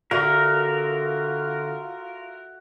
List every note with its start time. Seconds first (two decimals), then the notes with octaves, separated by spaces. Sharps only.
0.11 D3 F4 F#4 A#4 E5